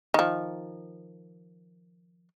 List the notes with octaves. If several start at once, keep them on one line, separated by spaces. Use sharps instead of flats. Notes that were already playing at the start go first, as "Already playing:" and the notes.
D#3 F3